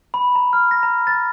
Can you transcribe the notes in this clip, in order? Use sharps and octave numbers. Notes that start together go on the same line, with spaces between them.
B5
A#5
F6
A#6
A#5
A6